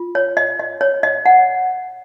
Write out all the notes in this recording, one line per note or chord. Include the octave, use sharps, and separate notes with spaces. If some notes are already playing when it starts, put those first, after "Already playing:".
Already playing: F4
C#5
D#5
D#5
C#5
D#5
F#5